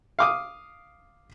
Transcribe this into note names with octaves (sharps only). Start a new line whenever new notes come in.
F5 D6 D#6